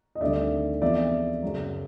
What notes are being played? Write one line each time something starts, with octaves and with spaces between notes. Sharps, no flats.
D#5
D2 C3 D#3 G3 D5 E5
E2 C3 F3 D5 E5
F#2 C#3 F#3